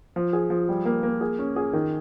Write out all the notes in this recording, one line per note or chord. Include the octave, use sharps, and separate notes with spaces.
F3
G#4
F3
G3
A#3
A#3
G#4
C#4
G#4
D#3